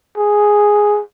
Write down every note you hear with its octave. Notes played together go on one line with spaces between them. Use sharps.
G#4